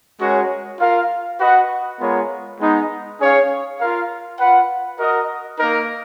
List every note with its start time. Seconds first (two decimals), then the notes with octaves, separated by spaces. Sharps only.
0.19 G#3 C#4 F#4 A#4 C#5
0.79 F4 A#4 F5
1.39 F#4 B4 D#5 F#5
1.99 G#3 B3 F4 A#4 C#5
2.59 G#3 B3 D#4
3.19 C#4 G#4 C#5 F5
3.79 F4 A#4 F5
4.39 F4 B4 F#5
4.99 F#4 A#4 D#5
5.59 A#3 D#4 A#4